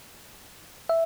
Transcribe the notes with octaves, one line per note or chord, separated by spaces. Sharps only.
E5